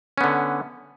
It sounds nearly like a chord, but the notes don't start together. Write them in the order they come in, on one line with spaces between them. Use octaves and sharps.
C#4 B3 D3